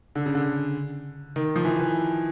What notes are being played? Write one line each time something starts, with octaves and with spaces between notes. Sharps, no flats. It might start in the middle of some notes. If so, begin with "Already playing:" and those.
D3
C#3
D3
D#3
F3
E3
E3